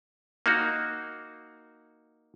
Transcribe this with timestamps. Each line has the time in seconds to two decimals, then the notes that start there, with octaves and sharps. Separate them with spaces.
0.46 A#3 D#4 F#4